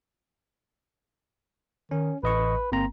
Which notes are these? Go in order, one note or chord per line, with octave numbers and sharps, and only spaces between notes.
D#3 C#4
A1 B4 D#5 C#6
G1 A#3 C4 A#5